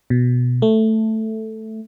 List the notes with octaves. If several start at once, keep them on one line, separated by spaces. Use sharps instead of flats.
B2
A3